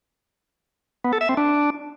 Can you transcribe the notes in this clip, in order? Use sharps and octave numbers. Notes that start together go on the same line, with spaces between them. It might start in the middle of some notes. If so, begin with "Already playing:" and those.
B3
A4
E5
C4
D4